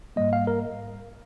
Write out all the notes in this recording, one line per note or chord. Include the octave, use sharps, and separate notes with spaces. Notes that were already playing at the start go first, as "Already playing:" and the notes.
G#2 G3 A#3 D#5
F5
A#4